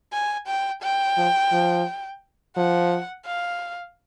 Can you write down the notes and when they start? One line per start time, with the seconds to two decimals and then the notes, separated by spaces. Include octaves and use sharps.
0.13 G#5
0.47 G5
0.82 G5
1.17 F3
1.52 F3
2.56 F3 F#5
3.26 F5